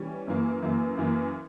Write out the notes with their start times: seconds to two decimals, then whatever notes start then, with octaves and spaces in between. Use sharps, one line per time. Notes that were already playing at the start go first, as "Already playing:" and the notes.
Already playing: E3 G3 C#4
0.27 F#2 E3 A#3
0.62 F#2 E3 A#3
0.97 F#2 E3 A#3